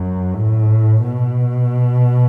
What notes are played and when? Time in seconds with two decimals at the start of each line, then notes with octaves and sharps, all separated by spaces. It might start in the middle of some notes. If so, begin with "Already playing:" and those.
Already playing: F#2
0.35 A2
1.01 B2